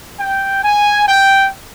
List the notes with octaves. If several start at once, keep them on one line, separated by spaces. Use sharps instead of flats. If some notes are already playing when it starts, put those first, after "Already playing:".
G5
G#5
G5